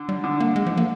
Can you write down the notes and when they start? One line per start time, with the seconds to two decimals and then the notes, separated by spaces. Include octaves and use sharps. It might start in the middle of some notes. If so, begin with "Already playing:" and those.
Already playing: D3
0.09 G3
0.24 D3
0.40 A#3
0.56 G#3
0.66 F3
0.77 A#3